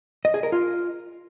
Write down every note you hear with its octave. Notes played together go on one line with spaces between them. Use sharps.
D#5
G#4
A#4
F4